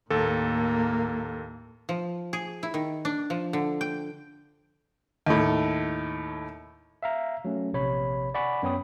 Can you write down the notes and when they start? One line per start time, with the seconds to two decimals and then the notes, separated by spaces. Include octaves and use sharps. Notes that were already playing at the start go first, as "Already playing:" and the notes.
0.10 D#2 A2 A#3 A4
1.89 F3
2.33 G#4
2.63 E4
2.74 D#3
3.05 D4
3.30 F3
3.53 D3
3.81 G5
5.26 D#2 A2
7.03 E5 F5 A#5
7.45 F#3 A3 C#4
7.73 A#1 C3 C#5 B5
8.34 D5 F#5 G#5 B5 C#6 D6
8.63 F#2 B3 C#5 G5 B5 D#6